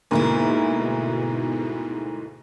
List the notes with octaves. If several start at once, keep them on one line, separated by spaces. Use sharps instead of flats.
D2 G#2 B2 A#3 D#4 E4